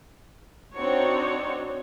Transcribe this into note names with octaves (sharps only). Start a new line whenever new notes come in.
C4 D4 D#4 F#4 C#5